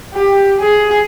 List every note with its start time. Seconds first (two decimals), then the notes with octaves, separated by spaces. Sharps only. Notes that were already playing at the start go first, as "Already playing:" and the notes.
0.14 G4
0.61 G#4